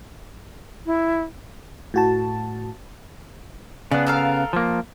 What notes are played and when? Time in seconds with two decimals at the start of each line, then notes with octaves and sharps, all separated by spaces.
0.86 E4
1.94 A2 F#4 A5
3.91 C#3 B3 D4
4.07 A4 A#4 F5
4.53 F3 A#3